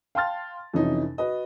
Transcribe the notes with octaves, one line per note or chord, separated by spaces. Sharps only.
F5 G5 A5 C6 F6 A6
F2 C3 E3 C#4 D#4
F#4 B4 D#5